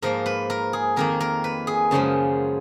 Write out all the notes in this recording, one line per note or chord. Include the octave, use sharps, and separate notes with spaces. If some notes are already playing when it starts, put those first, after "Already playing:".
G#2 F3 A#3 A#4
B4
A#4
G#4
F2 D#3 A#3 A#4
A#4
B4
G#4
F#2 C#3 F3 G#3